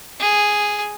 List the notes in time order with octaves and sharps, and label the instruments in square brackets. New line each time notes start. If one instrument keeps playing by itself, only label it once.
[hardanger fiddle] G#4